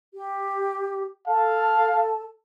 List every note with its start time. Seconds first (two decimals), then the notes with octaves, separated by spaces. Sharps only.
0.14 G4
1.27 A4 F5 A5